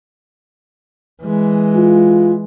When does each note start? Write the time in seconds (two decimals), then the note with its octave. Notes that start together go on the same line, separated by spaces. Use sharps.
1.23 E3 G#3
1.76 F4